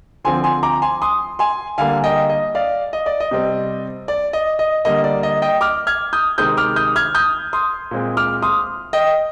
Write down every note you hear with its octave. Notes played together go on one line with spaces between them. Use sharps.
D3 F3 C4 G#5 C6
G#5 C6
A#5 D6
G#5 C6
C6 D#6
G#5 C6
D3 G3 A#3 F5 G#5
D#5 G5
D#5
D5 F5
D#5
D5
D#5
C3 G3 C4
D5
D#5
D#5
D3 G3 A#3 D#5
D5
D#5
D#5 G5
D6 F6
F6 G#6
D#6 G6
C3 D#3 G#3 C4 D#6 G6
D6 F6
D#6 G6
F6 G#6
D#6 G6
C6 D#6
A#2 G#3 C4
D6 F6
C6 D#6
D#5 G5